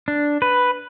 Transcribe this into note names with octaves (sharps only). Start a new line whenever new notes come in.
D4
B4